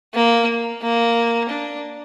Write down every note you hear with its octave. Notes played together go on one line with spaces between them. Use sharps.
A#3
A#3
D4